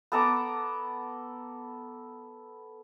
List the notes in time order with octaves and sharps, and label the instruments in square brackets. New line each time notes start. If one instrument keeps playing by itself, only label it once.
[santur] B3 A4 A#5 D6